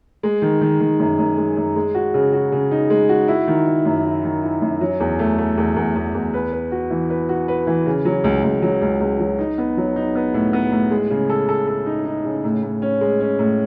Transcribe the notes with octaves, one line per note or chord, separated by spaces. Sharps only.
G#3
D#3
D#3
D#3
F#2
F#2
G#3
F#2
G#3
F#4
C#3
F#4
C#3
D#4
G#3
F#4
E4
D#3
E4
F#2
E4
D#3
E4
F#2
F#3
E2
A3
A3
E2
E2
E2
E2
B4
B4
F#4
E3
B4
F#4
B4
E3
C#3
F#3
C#2
C#2
F#3
C#2
C#2
F#3
D#4
B3
F#3
D#4
B3
A2
B3
A2
G#3
C#3
A4
A4
A4
D#4
D#4
C#3
A2
A2
C#4
G#3
C#4
A2